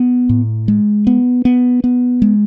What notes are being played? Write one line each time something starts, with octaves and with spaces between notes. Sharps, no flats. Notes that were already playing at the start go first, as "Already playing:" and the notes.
Already playing: B3
A2
G#3
B3
B3
B3
G#3